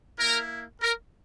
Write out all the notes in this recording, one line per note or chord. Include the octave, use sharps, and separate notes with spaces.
A#3 E4 A#4
A#4